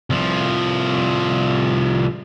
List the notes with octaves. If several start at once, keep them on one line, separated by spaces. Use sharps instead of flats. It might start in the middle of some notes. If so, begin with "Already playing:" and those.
C2 F3